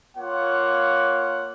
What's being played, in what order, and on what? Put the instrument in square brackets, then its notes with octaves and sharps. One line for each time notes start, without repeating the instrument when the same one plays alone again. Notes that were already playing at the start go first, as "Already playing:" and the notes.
[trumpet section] A#3 F4 C#5 F#5